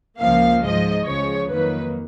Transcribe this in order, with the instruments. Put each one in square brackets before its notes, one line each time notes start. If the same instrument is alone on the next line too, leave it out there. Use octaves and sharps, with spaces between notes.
[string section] C#2 C#3 F3 A#3 F5
G#2 F3 G#3 D#5
C#2 C#3 F3 G#3 C#5
F2 D#3 F#3 A#3 B4